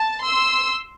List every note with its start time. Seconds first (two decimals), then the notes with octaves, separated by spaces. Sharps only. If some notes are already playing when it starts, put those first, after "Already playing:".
Already playing: A5
0.23 C6 E6